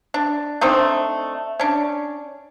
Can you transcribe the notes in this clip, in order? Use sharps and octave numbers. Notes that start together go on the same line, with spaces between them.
D4
A3 C4 D4 D#4
C#4 D4